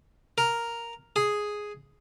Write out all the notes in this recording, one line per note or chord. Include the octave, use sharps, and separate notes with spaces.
A#4
G#4